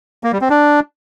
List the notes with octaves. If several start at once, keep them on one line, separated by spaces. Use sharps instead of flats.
A#3
G3
C4
D4